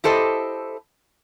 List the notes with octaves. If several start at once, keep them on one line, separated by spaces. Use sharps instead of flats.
E4 G4 A4 C5 D#5